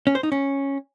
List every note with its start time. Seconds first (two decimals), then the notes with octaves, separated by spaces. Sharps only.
0.07 C#4
0.15 C5
0.23 D#4
0.32 C#4